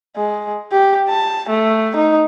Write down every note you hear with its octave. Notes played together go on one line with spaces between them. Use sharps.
G#3
G4
A5
A3
D#4